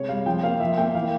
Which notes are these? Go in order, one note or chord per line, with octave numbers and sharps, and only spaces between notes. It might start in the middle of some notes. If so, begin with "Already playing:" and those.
Already playing: C3 G#3 C#5
G3 F5
F3 G5
A#3 F5
F3 E5
A#3 G5
E3 F5